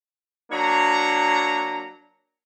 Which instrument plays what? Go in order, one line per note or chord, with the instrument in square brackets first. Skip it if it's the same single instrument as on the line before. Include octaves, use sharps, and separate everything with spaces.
[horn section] F#3 A#3 D4 C#5 A#5